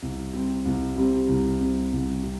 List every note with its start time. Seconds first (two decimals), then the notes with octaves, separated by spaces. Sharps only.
0.02 C2
0.33 C3 G3 C4
0.65 C2
0.96 C3 G3 C4
1.28 C2
1.60 C3 G3 C4
1.92 C2
2.23 C3